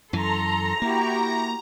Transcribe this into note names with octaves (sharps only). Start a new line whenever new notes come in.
F#2 E3 A4 A#5 C6
A#3 E4 F#4 G4